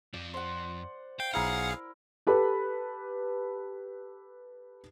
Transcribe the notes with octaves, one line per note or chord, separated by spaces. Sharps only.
F2 F3 D5
C5 F#5
F5 G5
B1 E4 G#4 A#4 F5 F#5
G4 A4 B4 A5 B5